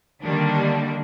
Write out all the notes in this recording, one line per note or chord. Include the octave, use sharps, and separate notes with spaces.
D3 D#3 G3 A#3 D4